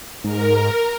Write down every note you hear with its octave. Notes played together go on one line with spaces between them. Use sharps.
G#2 A#4